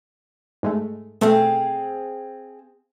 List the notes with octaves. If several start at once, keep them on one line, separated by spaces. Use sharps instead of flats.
G#2 G#3 A3
B2 A3 C4 G#4 F5